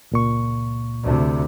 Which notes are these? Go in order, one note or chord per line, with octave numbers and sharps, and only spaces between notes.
C#2 A#2 C#6
D2 C3